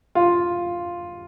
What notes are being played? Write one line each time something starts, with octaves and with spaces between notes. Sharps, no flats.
F4